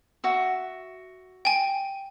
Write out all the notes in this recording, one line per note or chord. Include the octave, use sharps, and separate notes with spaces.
F#4 E5
G5 G#5